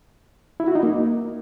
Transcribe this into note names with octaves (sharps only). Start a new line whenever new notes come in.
E4
F#4
D#4
A#3